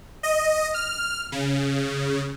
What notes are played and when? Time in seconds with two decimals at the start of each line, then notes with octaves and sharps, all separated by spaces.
0.23 D#5
0.74 F6
1.32 C#3